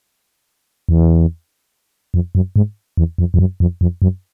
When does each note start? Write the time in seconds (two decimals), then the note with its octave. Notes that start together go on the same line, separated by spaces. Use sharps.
0.89 E2
2.14 F2
2.35 F#2
2.56 G#2
2.97 E2
3.18 F2
3.34 F2
3.39 F#2
3.60 F2
3.81 F2
4.02 F#2